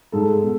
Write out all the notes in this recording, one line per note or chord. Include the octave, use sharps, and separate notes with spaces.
G#2 G#3 A4
B2